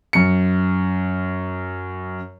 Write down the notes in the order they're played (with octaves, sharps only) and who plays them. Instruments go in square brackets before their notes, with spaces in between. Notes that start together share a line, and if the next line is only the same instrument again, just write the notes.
[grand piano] F#2 C#7